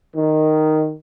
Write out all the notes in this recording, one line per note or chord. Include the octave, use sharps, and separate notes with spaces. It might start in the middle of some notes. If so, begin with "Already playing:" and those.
D#3